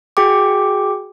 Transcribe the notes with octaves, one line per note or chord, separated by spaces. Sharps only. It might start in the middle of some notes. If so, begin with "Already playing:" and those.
F#4 G#4 G5 D6